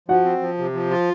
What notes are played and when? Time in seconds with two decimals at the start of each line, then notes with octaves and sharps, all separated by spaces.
0.08 F3 F#4 F#5
0.24 C4
0.41 F3
0.58 C3
0.73 F3
0.90 F4